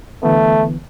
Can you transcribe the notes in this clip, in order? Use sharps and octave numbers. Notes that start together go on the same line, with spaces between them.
D3 E3 A3 B3